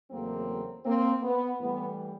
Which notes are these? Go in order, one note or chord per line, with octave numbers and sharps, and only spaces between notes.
E2 C#3 F#3 A3 A#3 C4
A#3 C4
B3
A2 E3 G3 B3